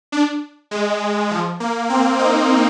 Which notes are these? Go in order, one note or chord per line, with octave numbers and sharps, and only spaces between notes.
D4
G#3
F3
A#3
C4
D#4